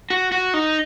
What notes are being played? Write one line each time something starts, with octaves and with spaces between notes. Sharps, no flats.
F#4
F#4
D#4